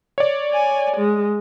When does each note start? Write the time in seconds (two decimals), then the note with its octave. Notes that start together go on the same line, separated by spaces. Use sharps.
0.18 C#5 D5
0.53 G#5
0.97 G#3